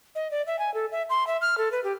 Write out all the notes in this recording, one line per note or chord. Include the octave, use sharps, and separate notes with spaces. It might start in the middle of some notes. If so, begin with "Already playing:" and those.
D#5
D5
E5
G#5
A4
E5
C6
E5
F6
A4
B4
G4